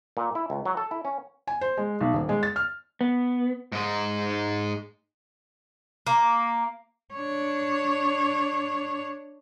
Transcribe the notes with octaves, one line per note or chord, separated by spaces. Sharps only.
A#2
E4
C#2
F#3
A4
E4
C#4
G#5
C5
G#3
B1
D#1
G#3
A6
F6
B3
G#2 G#3
A#3
D4 C#5